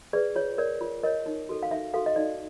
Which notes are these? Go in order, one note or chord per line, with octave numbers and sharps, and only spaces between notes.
G#4 B4 D5
F4 C#5
A#4 C#5 D5
F4
A#4 C#5 D#5
D#4
F#4 A4
F5
D#4 E5
F#4 A4 F5
D#5
D#4 D5